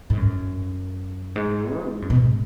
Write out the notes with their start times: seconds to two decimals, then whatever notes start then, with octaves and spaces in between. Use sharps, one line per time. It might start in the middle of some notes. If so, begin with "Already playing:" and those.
0.10 G#2
0.17 F#2
1.36 G#2
1.76 F#3
1.89 G#2
2.02 F#2
2.10 B2
2.15 G#2